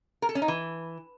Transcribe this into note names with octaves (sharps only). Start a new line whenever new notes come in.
A#4
A4
C#4
D#4
E3